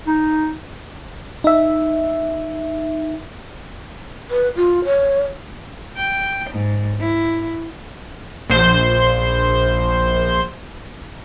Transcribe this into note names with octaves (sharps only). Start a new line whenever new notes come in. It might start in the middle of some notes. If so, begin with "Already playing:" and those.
D#4
D#4 E5
B4
F4
C#5
G5
G#2
E4
A#1 C5 G6